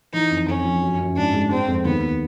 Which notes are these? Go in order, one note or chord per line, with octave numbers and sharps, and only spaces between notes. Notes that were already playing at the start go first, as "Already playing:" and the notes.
E3 D#4
F2
F2 C#4
F3
F#2
F#2
G#2 D4
G#3
G#3 C4
F2
D#2 B3